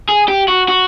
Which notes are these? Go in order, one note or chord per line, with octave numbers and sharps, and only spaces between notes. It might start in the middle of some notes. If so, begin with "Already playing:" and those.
G#4
G4
F#4
F#4